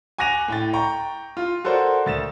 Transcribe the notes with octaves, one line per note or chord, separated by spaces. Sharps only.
G#5 D6 F#6 A#6 D#7 F7
A2 G5 A6
G5 A#5 C#6
F4
F#4 A4 A#4 C5 D5
D2 A6 E7